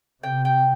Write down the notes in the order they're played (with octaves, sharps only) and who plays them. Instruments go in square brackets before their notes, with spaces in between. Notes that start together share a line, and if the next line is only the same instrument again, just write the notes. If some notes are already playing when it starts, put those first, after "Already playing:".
[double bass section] C3 [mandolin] G5
[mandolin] G5